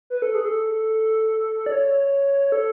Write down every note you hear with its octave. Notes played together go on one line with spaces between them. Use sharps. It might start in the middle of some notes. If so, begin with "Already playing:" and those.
B4
A4
G#4
A4
D5
C#5
A4